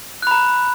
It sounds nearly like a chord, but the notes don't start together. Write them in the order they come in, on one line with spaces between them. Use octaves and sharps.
F#6 B5 A#5